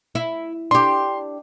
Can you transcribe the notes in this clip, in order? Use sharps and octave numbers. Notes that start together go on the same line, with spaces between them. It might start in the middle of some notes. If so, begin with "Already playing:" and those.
E4
D4 G4 C6